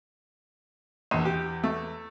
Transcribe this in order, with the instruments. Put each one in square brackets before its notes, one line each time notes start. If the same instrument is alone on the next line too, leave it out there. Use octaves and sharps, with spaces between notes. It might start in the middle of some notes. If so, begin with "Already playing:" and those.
[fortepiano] A#1 [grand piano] E2 D#7
[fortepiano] G4
A3